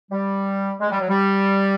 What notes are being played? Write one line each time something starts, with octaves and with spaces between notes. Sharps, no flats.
G3
G#3
G3
F#3
G3